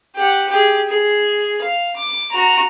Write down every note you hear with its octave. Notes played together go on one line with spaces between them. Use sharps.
G4 F#5
G4 G#4
G#4
F5
D6
F#4 A#5